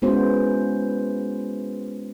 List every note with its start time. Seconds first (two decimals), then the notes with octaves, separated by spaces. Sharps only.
0.02 G#3 B3 C#4 E4 F#4 C5